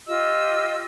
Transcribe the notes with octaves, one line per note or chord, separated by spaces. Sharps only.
F4 G4 D#5 E6